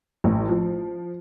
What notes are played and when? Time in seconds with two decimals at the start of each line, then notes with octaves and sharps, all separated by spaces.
0.24 A1
0.49 F3